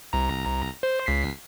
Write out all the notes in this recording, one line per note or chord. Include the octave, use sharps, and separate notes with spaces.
C2 A#5
C5
C#2 B6 C7